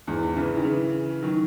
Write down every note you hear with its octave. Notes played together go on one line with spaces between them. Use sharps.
E2 G#2
C#3 E3
D#3
C#3 E3
D#3 F#3